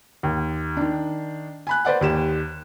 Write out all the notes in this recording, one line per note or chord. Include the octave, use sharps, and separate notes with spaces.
D#2
D#3 D4
G#5 B5 F#6
B4 C5 D5 F#5
D#2 G4 E7